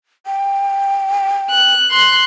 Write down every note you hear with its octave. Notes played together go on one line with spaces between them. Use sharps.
G5
F#6
C6 F#6